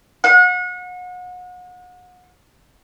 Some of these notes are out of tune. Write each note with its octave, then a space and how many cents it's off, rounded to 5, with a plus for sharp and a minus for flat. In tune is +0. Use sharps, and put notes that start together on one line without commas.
F#5 -35